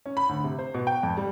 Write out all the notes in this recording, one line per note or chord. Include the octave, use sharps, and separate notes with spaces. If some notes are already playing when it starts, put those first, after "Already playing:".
C#4
B5
D2
C3
C5
B2
G5
F2
G3